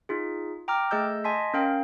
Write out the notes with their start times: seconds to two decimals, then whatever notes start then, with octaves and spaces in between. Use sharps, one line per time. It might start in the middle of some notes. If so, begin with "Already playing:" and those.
0.09 D#4 F4 G#4
0.68 G5 A#5 D6 F6
0.91 A3 G#4 D#5 E6 G6
1.24 D#5 G#5 A5 C6 B6
1.54 C#4 A#4 F5 G5